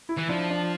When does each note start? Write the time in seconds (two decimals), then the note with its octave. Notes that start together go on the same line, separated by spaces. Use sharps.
0.09 E4
0.18 E3
0.30 F3 D4
0.50 D4